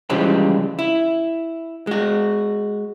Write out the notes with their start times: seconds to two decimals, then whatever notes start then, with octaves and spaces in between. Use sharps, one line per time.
0.10 C#3 E3 F3 G3 G#3 C4
0.79 E4
1.87 G#3 F#4